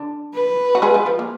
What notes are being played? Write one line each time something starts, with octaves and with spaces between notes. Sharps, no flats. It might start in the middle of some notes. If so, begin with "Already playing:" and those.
Already playing: D3 D4
B4
F#4
G#3 G#4
F3 F4
F3 F4
A#3